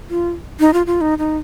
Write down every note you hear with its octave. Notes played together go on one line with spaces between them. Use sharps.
F4
D#4
F4
F4
D#4
D#4